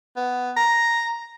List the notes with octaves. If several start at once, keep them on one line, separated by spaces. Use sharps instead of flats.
B3
A#5